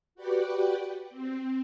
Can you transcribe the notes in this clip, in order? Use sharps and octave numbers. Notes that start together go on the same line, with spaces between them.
F#4 G4 B4 D5 F#5 G5
C4